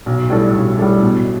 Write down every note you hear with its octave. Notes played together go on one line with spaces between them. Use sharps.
B1
A2 G3 D4 A4
B1
A2 G3 D4 A4
B2